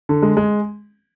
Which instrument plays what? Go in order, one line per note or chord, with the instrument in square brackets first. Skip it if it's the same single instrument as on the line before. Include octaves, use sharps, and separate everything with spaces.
[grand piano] D3
G#3
G#3